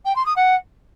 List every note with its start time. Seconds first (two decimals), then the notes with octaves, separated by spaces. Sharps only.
0.05 G5
0.15 C6
0.25 D#6
0.36 F#5